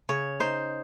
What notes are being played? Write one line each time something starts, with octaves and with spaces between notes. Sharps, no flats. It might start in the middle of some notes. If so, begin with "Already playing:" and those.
C#3 C#5
D#4 C5